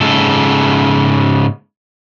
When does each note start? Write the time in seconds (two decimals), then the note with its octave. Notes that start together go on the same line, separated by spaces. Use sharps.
0.01 G#2 C#3 A4